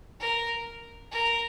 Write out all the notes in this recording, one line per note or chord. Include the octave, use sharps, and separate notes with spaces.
A#4
A#4